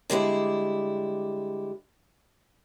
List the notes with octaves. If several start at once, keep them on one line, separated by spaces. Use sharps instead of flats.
D3 G3 G#3 E4